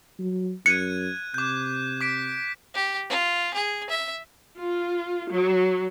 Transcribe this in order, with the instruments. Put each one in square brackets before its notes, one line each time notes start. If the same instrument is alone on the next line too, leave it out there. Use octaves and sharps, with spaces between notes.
[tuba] F#3
[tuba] F#2 [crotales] F#6 G#6 D#7 [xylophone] C#7
[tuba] C3 [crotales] D6 G6
[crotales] D6 B6 D7
[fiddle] G4
F4
G#4
E5
[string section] F4
F#3